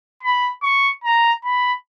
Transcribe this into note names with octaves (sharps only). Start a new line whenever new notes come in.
B5
C#6
A#5
B5